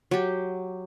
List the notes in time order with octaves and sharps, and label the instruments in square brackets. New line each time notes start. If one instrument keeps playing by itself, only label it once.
[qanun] F#3 G4